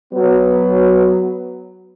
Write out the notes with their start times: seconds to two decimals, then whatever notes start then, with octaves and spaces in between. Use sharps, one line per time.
0.13 F#3 B3